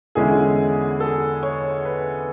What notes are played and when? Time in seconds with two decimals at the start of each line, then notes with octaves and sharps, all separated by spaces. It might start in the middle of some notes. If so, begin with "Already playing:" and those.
0.15 E2 D3 G#3 C#4 E4 G#4
1.00 A4
1.43 C#5
1.85 B4